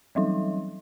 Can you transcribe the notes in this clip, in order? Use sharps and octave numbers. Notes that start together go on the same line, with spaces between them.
E3 F#3 G3 D#4